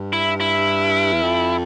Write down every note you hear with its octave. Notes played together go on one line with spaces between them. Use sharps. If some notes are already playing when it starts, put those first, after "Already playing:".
Already playing: G2
E4
E4
E2
F2